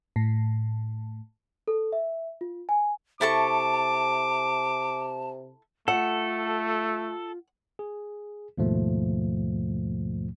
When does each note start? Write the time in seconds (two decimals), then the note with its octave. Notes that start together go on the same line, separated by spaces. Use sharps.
0.16 A2
1.68 A4
1.93 E5
2.41 F4
2.69 G#5
3.21 C3 E4 A4 A5 C#6 D6
5.88 A3 F4 A4 F#5
7.79 G#4
8.58 D#2 G#2 B2 F3 A3